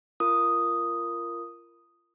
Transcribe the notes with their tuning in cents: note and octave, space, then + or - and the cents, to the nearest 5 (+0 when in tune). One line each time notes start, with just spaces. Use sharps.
F4 -25 A#4 +0 D#6 +0